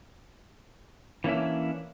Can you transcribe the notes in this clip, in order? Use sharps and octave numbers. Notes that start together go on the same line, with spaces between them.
E3 A#3 C#4 D4 E5